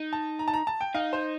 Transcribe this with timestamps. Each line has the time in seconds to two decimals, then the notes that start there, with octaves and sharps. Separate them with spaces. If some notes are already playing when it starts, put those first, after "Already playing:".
Already playing: D#4
0.13 A5
0.39 A#5
0.48 A5
0.54 A#5
0.67 A5
0.81 G5
0.95 D#4 F5
1.13 C5